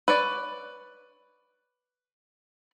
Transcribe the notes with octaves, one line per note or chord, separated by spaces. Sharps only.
B4 C#5 D5